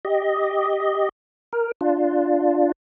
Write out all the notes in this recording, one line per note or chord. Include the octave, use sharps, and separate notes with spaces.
G4 D#5
A#4
D4 F4